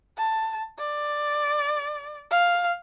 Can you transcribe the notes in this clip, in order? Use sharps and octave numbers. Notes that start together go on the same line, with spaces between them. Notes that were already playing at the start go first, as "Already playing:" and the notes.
A5
D5
F5